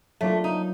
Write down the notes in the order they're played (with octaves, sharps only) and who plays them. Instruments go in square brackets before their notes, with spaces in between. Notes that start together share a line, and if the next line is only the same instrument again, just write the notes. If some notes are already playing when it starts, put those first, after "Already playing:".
[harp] F#3 A#3 D4 F4 [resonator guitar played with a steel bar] A3
[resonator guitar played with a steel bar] D#4